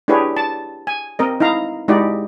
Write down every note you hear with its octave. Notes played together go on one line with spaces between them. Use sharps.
D4 E4 G4 G#4 B4 C#5
A5
G#5
C4 A#4 D#5
D#4 E4 F5 A#5
G#3 D#4 E4 F#4 G4 D5